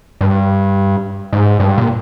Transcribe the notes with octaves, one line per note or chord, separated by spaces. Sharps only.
G2
G#2
G2
A#2